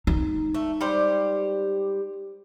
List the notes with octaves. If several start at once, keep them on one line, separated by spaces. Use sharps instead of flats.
G#3 D#4
A3
G3 G4 C5